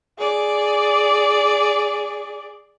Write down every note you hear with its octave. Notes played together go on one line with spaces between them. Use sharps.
G#4 D5